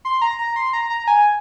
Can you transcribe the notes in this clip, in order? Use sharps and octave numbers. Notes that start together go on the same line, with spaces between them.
C6
A#5
A#5
C6
A#5
A#5
G#5